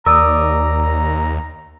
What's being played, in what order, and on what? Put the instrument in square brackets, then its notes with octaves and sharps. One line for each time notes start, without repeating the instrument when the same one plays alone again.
[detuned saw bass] D#2 [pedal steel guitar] A#4 D5 D#6 [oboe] A#5 [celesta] E6